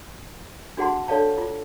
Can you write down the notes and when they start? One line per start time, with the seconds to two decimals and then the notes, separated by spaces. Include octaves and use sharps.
0.77 D4 F#4 G#4 F#5 A5 C6
1.08 D4 A4 C#5 D5 F5 A5
1.38 F4